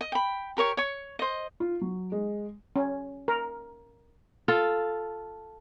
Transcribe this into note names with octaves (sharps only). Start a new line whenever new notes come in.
D#5
G5 B5
G4 A#4 C#5 C#6
C#5 C#6
C5 D#5
F4
F#3
G#3
C#4
A#4
F4 A4